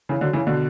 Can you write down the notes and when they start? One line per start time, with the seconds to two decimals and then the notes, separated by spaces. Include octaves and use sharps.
0.09 C#3 E3
0.21 D3 F#3
0.33 C#3 E3
0.47 B2 D3